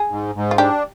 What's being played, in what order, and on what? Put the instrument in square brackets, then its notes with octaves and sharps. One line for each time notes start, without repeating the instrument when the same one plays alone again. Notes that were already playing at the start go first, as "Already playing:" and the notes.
Already playing: [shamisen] G#4
[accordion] G#2
G#2
[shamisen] F4
[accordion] D4 [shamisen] G4